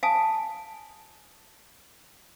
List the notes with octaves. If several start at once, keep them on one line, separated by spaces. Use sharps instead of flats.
F5 G#5 A5 D#6